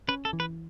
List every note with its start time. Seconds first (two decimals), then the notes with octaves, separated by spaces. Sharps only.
0.08 C#4 B4
0.25 A4
0.33 E3
0.40 B4